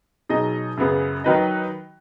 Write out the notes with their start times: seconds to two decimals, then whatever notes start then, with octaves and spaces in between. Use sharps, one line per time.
0.29 B2 F#3 D#4 G#4 D#5
0.77 F#2 C#3 B3 G#4
1.24 D#3 F#3 D#4 B4 D#5